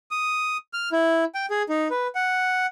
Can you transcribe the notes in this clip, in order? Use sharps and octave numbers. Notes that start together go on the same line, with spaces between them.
D#6
F6
E4
G5
G#4
D#4
B4
F#5